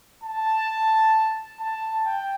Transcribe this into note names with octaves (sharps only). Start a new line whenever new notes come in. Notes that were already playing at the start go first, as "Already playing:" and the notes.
A5
A5
G5